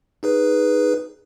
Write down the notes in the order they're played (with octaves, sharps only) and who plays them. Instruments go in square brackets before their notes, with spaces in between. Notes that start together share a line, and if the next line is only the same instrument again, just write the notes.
[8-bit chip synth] D#4 G#4 B4